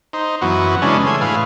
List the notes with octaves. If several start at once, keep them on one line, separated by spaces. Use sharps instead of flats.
D#4 C5
F#2 E3 B3 F#4
C#3 E3 G#3 C#4 D4
A3 G#5 C6
A2 G#4 B4 F5